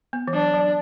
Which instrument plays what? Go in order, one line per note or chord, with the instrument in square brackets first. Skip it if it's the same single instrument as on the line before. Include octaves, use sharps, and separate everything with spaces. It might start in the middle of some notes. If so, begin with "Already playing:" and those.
[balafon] B3
E3
[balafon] F#3 [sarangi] D4
[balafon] F#3